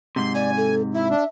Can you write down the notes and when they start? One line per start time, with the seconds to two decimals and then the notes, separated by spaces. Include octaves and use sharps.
0.16 G#2 C3 C6
0.35 D5 G#5
0.57 A4
0.95 E4 E5
1.10 D4